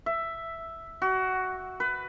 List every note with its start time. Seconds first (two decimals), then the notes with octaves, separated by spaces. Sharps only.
0.06 E5
1.02 F#4
1.80 B4